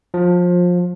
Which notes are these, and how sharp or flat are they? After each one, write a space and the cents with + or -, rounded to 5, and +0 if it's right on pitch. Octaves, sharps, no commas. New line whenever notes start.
F3 +25